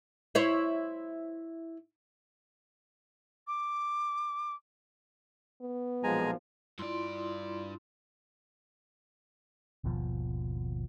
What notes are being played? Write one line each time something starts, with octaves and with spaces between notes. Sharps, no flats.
E4 C5 C#5
D6
B3
B1 A#2 F3 G#3 G#5 A#5
G2 E4 F4 D5 C6
G#1 D#2 B2 F3